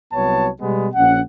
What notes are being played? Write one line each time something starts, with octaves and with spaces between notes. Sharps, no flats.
C2 F#3 B3 C#5 A5
B2 G3 G#3 B3
A#1 C#4 F#5